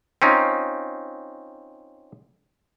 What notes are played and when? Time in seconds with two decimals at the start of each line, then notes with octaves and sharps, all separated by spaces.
0.22 C4 C#4 D#4 F4